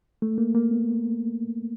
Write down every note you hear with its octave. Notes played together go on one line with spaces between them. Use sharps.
A3
A#3
A#3
B3